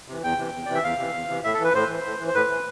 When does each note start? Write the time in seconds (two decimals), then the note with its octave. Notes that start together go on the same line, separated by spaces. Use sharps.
0.08 C3 E3
0.24 E2 G5
0.38 C3 E3
0.53 E2
0.66 C3 E3 D5
0.75 E5
0.84 E2 F5
0.99 C3 E3
1.14 E2
1.29 C3 E3
1.44 A2 E5
1.54 A4
1.60 E3 B4
1.74 A2 C5
1.89 E3
2.05 A2
2.20 E3
2.28 C5
2.35 A2 B4
2.49 E3